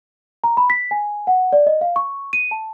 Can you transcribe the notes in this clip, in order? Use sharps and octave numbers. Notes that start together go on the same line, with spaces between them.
A#5
B5
B6
G#5
F#5
D5
D#5
F5
C#6
D#7
A5